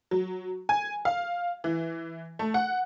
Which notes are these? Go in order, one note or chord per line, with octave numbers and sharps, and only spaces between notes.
F#3
G#5
F5
E3
A3
F#5